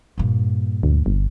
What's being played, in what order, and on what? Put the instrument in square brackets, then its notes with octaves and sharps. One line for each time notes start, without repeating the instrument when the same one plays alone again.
[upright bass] G2 A#2
[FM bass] D2
G1